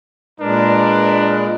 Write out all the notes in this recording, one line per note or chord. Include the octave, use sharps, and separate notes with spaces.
A#2 G#3 D4 A#4 B4